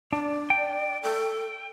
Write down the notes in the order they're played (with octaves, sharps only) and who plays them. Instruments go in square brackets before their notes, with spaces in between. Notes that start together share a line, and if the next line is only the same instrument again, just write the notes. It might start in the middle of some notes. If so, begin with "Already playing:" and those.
[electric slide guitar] D4 [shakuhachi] D5
[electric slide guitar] G5
[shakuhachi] A4